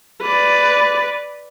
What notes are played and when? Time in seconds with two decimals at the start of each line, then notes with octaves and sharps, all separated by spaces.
0.22 B4 D5